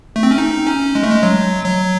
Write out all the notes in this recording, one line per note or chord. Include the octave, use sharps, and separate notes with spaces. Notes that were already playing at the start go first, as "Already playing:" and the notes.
A3
C4
C#4
D#4
C#4
G#3
A3
G#3
F#3
F#3